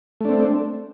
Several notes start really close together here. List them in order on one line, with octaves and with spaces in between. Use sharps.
A3 D4 C4